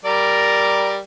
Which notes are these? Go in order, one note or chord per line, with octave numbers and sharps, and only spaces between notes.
G3 A#4 D5